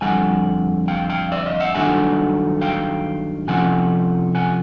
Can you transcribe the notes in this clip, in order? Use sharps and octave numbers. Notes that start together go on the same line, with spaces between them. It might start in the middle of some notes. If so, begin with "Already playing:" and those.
F2 D3 G3 F#5 G#5
F5 G5
F5 G5
D5 E5
D#5 F5
E5 F#5
G2 D#3 F#3 A3 D4 F#5 G#5
F5 G5
C3 F3 A3 C#4 F#5 G#5
F#5 G#5